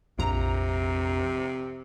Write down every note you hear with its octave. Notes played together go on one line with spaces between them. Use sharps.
A#1 F2 C3 A#5